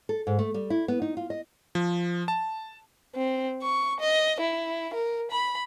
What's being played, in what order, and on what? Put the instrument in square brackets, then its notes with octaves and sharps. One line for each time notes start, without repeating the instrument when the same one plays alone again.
[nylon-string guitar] A4
G#2
A3
G3
E4
B3
D#4
F4
D#5
[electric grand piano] F3
A5
[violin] C4
C#6
D#5
E4
A#4
B5